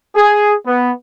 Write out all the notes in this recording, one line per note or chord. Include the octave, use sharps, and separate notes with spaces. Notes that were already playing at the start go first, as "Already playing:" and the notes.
G#4
B3